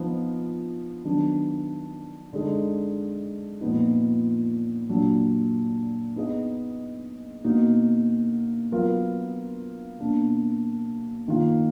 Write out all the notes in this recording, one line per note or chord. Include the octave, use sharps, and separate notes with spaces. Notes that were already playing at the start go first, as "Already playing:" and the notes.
Already playing: F3 B3 D#4
D#3 F#3 B3 D4
D3 G#3 D#4
A#2 F3 B3 D#4
A#2 F#3 D4
B3 D#4 G#4 D#5
B2 A#3 D#4 F#4
F#3 B3 F4 A#4
B2 A#3 D4
D#3 A#3 F4